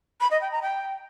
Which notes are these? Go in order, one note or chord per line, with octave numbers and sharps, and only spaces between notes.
B5
D#5
G5
A#5
G5